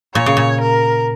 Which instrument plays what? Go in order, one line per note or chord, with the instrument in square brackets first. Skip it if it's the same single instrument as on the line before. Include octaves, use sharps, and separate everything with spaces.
[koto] A#2 [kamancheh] C#5
[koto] C#3
A#2
[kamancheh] A#4